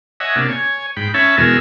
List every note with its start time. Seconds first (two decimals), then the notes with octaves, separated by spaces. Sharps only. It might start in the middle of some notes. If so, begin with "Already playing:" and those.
0.20 C#5 D#5 E5 F#5 G#5
0.36 C3 A#3 D4
0.49 C#5 G#5
0.96 G#2 G5 B5
1.14 C#4 C#5 E5 A5 B5
1.38 E2 B2 G#3 A#4 G#5 E6